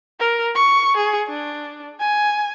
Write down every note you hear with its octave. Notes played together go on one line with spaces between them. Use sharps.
A#4
C#6
G#4
D4
G#5